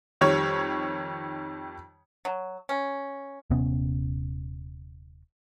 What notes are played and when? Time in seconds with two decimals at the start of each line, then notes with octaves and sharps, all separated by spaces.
0.21 F2 D#3 G3 C#5
2.25 F#3
2.69 C#4
3.50 D#1 C3 B3 C#4